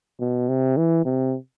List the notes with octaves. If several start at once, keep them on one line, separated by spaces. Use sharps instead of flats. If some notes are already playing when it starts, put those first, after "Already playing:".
B2
C3
E3
C3